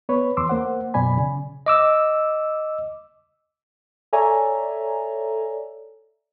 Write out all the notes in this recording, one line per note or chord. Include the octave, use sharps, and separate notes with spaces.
B3 B4 C#5
E2 C6 D6 E6
A#3 C5 F#5
F#2 B2 D5 G#5 B5
C#3
D#5 D6 E6
A4 C#5 D5 E5 G#5 A#5